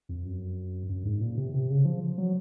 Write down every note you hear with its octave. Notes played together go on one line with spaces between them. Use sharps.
F2
F#2
F#2
G#2
A#2
C3
C3
C#3
F3
F#3